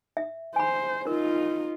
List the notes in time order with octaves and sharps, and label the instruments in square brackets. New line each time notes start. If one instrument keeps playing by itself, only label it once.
[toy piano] E5
[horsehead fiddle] C5 [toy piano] G#5 B5
[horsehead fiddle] D#4 F4 [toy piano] A#4